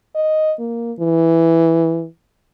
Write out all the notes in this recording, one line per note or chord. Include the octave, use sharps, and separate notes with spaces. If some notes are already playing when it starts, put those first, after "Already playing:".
D#5
A#3
E3